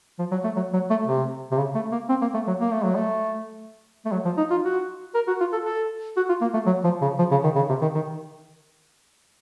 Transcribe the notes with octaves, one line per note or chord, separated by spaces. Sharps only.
F3
F#3
A3
F#3
F#3
A3
C3
C3
C#3
A3
A#3
C4
A#3
A3
F#3
A#3
A3
F#3
A3
A3
F#3
F3
D#4
F4
F#4
A#4
F#4
F4
A4
A4
F#4
F4
A#3
A3
F#3
F3
C#3
F3
C#3
D#3
C#3
C3
D#3
D#3